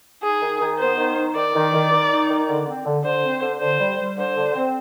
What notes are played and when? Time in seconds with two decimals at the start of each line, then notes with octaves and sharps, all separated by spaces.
0.23 D#4 G#4
0.41 D#3
0.61 D#3
0.79 B3 C5
0.98 D#3
1.17 D#4
1.35 D#3 D5
1.55 D#3
1.73 D#3
1.92 D#3
2.10 D#4
2.30 D#3
2.48 D3
2.66 C4
2.86 D3
3.04 D3 C5
3.24 C4
3.42 D3
3.61 D3 C5
3.80 G3
3.99 G3
4.17 D3 C5
4.36 D3
4.55 C4